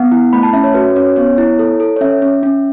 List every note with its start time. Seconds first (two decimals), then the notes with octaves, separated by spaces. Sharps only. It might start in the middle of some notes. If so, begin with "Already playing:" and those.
Already playing: B3 F#5
0.12 E4
0.33 A3 B5
0.43 A5
0.53 C#4 E5
0.64 C#5
0.74 F#4 B4
0.96 C#4 C#5
1.16 B3 C#5
1.38 E4
1.59 A4
1.80 A4
1.96 C#5
2.01 C#4 E5
2.22 C#4
2.43 C#4